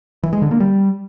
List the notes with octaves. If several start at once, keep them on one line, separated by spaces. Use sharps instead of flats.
E3
G#3
D3
A#3
G3